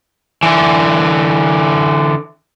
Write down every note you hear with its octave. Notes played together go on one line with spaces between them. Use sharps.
D3 E3